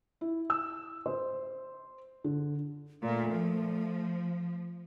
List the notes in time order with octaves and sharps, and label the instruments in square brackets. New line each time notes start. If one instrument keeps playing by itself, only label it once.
[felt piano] E4
E6
C5
D3
[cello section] A#2 [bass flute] A3
[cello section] F3